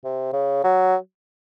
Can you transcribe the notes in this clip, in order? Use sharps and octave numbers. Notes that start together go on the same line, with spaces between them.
C3
C#3
F#3